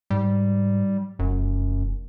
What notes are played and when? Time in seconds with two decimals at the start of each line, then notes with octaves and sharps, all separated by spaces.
0.10 G#2 G3
1.19 F1 F#2